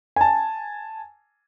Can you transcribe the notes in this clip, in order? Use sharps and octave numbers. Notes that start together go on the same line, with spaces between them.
G#5 A5